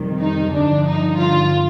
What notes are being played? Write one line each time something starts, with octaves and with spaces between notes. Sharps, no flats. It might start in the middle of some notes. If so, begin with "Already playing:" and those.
Already playing: F2 C3 D#3 G3
D#4
G2 D3 F3 D4
D#4
F4